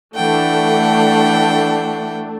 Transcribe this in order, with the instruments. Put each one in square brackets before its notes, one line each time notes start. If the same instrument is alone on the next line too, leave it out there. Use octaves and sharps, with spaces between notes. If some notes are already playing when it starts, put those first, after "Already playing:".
[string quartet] E3 F#5 G5 [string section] A3 D4